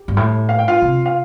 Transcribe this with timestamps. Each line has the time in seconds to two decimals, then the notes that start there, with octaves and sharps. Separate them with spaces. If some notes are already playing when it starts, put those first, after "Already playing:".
Already playing: G4
0.08 G2
0.17 A2
0.49 F5
0.59 G5
0.68 F4 F5
0.82 C3
1.06 F5